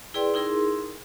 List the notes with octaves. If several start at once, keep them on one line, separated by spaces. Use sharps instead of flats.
E4 G#4 B4 D5 G5 C6
D#4 E4 G#4 A#4 C6